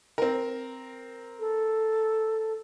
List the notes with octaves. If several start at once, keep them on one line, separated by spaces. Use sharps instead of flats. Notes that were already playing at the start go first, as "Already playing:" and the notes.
C4 A#4
A4